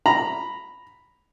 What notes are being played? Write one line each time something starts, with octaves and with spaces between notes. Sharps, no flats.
A#5 B5